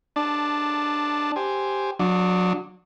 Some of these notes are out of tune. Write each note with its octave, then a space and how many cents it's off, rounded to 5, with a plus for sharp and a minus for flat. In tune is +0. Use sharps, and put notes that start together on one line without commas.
D4 +10 A5 -5
G4 +0 C5 +0 G#5 +0
F#3 -25 D4 +0